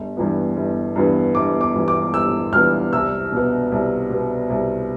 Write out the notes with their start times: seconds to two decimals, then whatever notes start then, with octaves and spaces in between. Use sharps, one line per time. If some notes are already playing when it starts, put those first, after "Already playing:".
Already playing: G1
0.17 G2 E3 B3
0.56 G1
0.96 G2 E3 B3
1.35 G1 D6
1.61 D6
1.75 G2 E3 B3
1.88 D6
2.14 G1 E6
2.52 G2 E3 B3 F6
2.93 C2 E6
3.32 B2 B3
3.72 C2
4.10 B2 B3
4.50 C2